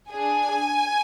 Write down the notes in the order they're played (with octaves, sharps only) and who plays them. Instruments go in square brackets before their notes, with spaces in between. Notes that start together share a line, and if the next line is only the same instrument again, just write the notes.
[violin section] D4 G#4 G#5